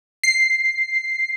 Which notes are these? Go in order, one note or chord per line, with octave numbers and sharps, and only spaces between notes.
C7